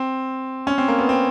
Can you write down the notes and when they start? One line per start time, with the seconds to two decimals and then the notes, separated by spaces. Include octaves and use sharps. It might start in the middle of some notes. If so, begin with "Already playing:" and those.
Already playing: C4
0.67 C#4
0.78 C4
0.88 A#3
0.99 B3
1.09 C4